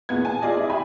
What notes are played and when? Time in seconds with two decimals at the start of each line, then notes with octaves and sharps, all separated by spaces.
0.09 E2 A#2 B3 G#6
0.25 G#5 A5
0.42 F4 G#4 D5 D#5
0.57 E4
0.70 G4 E5 G#5 B5